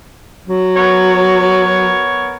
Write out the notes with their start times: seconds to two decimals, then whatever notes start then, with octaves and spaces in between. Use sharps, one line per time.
0.48 F#3
0.77 B3 A#4 C#5